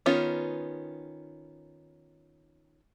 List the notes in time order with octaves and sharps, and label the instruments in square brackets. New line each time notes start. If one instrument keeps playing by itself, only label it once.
[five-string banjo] D#3 B3 C#4 F4